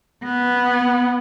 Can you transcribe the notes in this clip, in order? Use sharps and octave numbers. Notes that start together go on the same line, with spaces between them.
B3